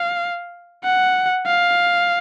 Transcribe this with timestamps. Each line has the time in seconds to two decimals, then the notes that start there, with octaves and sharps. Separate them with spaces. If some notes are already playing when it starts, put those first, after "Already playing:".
Already playing: F5
0.84 F#5
1.46 F5